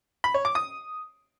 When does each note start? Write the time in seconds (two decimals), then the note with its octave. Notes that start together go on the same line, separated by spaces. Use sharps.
0.24 B5
0.34 C#5
0.45 D6
0.55 D#6